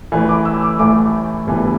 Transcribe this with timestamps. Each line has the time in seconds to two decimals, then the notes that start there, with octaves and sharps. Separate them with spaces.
0.12 A1 A2 E3 A3
0.29 D6
0.45 E6
0.62 D6
0.79 A1 A2 E3 A3 D6
1.47 G1 G2 E3